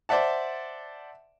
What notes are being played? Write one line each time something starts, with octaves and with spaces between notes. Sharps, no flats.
C5 D5 E5 F#5 A5